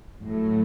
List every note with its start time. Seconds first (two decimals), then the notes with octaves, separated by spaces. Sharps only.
0.24 A2 F#3 A3